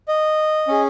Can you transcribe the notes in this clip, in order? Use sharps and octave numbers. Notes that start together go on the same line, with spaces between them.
D#5
C#4 G#4